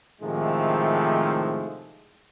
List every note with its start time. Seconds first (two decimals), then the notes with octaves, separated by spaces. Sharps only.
0.22 A2 C3 D#3 F3 G#3 A3